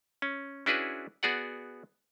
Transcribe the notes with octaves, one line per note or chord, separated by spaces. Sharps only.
C#4
C#4 D4 E4 F#4 G#4 B4
B3 F#4 G#4 D5 F#5